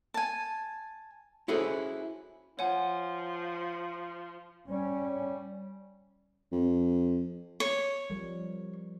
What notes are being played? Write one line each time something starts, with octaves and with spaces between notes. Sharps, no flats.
G#5 A5
C#4 E4 F#4 G#4 A4 C5
F3 C#5 F#5 G#5
G3 C#4
F2
C#5
F3 G3 A#4